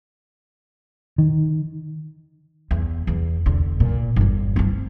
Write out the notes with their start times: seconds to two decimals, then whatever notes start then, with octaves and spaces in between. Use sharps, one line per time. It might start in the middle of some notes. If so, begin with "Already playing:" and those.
1.18 D#3
2.71 E2
3.07 E2
3.46 E2 D3
3.80 A#2
4.16 G1 E2
4.56 C4 C#4